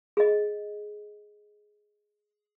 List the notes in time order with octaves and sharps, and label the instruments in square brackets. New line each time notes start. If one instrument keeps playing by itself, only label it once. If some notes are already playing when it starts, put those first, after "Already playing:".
[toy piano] G#4 D#5